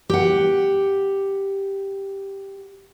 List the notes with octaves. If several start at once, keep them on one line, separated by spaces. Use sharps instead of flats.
G4 F#5